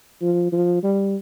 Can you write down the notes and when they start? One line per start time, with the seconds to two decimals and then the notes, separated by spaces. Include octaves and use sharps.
0.21 F3
0.52 F3
0.83 G3